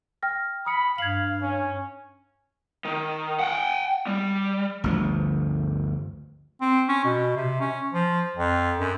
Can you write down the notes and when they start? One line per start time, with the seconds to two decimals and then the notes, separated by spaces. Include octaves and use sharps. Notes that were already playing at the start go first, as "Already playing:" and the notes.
0.23 G5 F6 A#6
0.66 B5 D#6 C#7
0.98 G2 F5 G#6 F#7
1.42 C#4
2.85 D#3
3.39 F#5 G5
4.07 G3
4.84 G1 D2 F3
6.61 C4
6.88 C#4
7.05 B2
7.36 C3
7.60 C#4
7.93 F3
8.36 F2
8.79 F#2